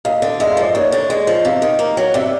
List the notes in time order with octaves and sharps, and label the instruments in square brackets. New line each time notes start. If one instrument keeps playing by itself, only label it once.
[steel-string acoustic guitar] D#2 [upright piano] D#5 F5
[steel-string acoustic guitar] D3
[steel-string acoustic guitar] G#3 [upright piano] E5
[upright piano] F5
[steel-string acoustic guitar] F3
[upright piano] D5 E5
[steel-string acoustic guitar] D#2 [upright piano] C#5 D#5
[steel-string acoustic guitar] D3
G#3
F3
[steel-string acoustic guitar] C3 [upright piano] D#5 F5
[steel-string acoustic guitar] D#3
A#3
F#3
[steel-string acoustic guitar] C3 [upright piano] D5 E5